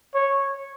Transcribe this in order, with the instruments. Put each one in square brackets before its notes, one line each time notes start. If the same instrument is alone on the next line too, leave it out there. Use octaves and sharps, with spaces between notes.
[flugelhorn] C#5